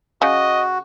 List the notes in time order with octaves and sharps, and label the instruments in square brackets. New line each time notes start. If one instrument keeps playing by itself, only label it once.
[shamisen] C#3 [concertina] F#4 [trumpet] D#5